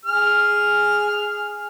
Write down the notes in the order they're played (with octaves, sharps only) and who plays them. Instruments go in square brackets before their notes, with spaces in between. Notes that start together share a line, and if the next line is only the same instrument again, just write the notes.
[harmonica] G#4 F6